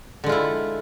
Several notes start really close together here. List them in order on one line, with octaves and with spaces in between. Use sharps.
D3 G#3 F4 E4